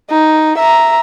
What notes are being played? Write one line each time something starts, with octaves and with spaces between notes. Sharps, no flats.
D#4
E5 A#5